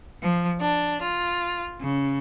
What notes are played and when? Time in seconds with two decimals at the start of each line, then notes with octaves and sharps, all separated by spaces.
0.23 F3
0.61 D4
1.01 F4
1.81 C#3